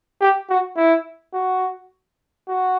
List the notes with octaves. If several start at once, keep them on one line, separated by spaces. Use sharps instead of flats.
G4
F#4
E4
F#4
F#4